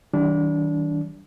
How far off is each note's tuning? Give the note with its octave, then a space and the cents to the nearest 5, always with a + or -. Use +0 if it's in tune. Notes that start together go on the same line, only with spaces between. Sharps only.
D#3 +45 G3 -25 D4 -25